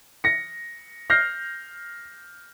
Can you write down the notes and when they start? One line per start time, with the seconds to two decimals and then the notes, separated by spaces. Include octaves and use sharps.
0.24 A#6 C#7
1.10 F6 G6 A#6 C7